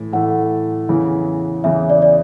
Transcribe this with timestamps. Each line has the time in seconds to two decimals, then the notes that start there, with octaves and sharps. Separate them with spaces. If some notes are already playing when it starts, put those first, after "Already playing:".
Already playing: A2 E3
0.13 A2 E3 A3 F#5
0.89 E2 C#3 E3
1.64 E2 C#3 E3 E5
1.90 D5
2.02 D5